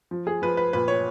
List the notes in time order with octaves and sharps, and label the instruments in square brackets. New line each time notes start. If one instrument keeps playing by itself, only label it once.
[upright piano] F3
G#4
F3 B4
B4
A#2 B4
C#5